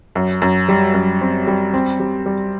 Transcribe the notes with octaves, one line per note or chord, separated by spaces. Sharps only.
F#2
F#2
G3
F#2
C4
G3
C4
G3
G3